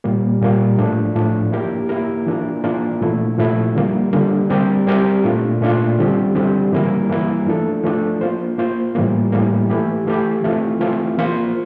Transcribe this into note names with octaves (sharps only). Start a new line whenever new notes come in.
A#2 G3 A#3
A#2 G3 A#3
A2 F3 A3 D4
A2 F3 A3 D4
A#3 E4 G4 A#4
A#3 E4 G4 A#4
E3 A#3 D4 F4 A#4
E3 A#3 D4 F4 A#4
A#2 F3 A3 E4
A#2 F3 A3 E4
D3 G3 A#3
D3 G3 A#3
G3 C4 G4 A#4
G3 C4 G4 A#4
A#2 A3 D4 F4
A#2 A3 D4 F4
D3 G3 C4 G4
D3 G3 C4 G4
E3 G3 A#3 E4 A#4
E3 G3 A#3 E4 A#4
F3 A3 D4 A4
F3 A3 D4 A4
A#3 F4 C5
A#3 F4 C5
A2 E3 G3 A#3
A2 E3 G3 A#3
E3 A3 E4 G4
E3 A3 E4 G4
E3 A3 C4 F4
E3 A3 C4 F4
F3 A#3 F4 C5